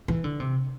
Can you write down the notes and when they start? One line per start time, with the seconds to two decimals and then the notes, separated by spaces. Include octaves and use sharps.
0.08 E3
0.24 D3
0.40 C3